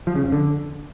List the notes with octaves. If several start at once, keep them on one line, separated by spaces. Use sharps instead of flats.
F3
C#3
F2
D3